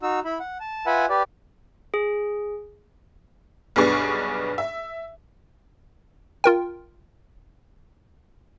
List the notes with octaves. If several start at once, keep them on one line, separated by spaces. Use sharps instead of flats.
D#4 F#4 E6
E4 B5
F#5
A5
F4 B4 E5 F#5 G#5 B5
G4 B4 D5
G#4
B1 G2 B3 D4 G#4 C#6
E5
F4 A#4 G5